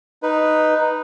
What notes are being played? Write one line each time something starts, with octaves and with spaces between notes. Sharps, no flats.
D#4 B4